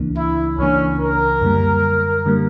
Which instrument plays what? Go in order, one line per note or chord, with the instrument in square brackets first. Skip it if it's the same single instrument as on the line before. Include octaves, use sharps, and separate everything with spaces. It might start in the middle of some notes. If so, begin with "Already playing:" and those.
Already playing: [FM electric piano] C#2 C#3 E3 A#3 D4
[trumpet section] E4
[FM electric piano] C#2 C#3 E3 A#3 D4 [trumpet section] C#4
[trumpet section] A#4
[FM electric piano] F#2 D3 G3 A#3
D3 G3 A#3